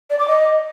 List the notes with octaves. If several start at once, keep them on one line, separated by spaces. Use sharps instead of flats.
D5
D6
D#5